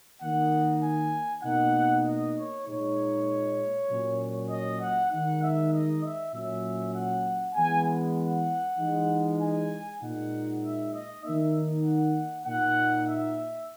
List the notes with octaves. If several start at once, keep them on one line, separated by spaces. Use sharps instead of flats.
D#3 A#3 D#4 F#5
G#5
B2 A#3 D#4 F#5
D#5
C#5
A#2 G#3 D#4 C#5
A#2 F#3 C#4
D#5
F#5
D#3 G#3 D#4 F#5
E5
D#5
E5
A#2 F#3 C#4 E5
F#5
E3 G#3 B3 G#5
F#5
E3 G#3 D#4
G#5
A#2 G#3 D#4 F#5
E5
D#5
D#3 A#3 D#4 E5
F#5
A#2 A#3 D#4 F#5
E5